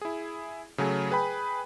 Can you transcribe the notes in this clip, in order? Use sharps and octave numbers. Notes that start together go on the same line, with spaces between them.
E4 G#4
C#3 F#3 A3 G#4
G#4 B4 G5 B5